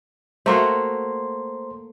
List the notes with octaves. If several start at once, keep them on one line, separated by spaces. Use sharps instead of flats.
A3 A#3 F#4 C5 A#5 C6